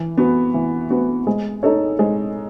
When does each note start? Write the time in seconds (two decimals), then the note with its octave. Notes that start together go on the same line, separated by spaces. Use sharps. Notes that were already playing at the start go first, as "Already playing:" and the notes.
Already playing: E3
0.17 B3 F#4 B4
0.54 E3
0.90 B3 F#4 B4
1.27 G#3
1.63 D#4 A4 C#5
1.99 G#3